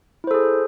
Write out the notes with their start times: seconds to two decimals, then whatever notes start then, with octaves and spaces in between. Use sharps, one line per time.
0.24 E4
0.27 C5
0.31 A4
0.34 G#4